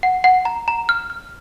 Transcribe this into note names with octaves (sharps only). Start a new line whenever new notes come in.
F#5
F#5
A#5
A#5
F6
F6